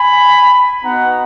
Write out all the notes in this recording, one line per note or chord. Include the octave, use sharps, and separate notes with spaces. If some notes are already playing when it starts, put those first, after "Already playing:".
Already playing: G#5 B5
B3 D#4 F#4 F#5 A#5